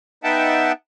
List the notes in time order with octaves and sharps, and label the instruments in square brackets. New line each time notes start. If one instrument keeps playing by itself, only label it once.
[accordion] B3 D#4 E5 F#5 G5 A5